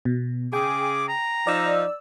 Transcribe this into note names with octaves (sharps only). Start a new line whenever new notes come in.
B2
C#3 G#4 G5 D6
A#5
F3 D#4 D5 E6